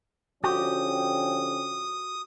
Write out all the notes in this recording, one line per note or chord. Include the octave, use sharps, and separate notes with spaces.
D3 F3 C#4 F#4 G4 D#6